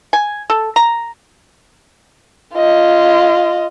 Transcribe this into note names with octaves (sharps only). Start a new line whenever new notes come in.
G#5
A4
A#5
F4 D#5